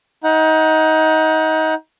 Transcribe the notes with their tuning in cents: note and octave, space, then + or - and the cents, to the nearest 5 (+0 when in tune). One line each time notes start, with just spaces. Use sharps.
D#4 +25 F#5 +0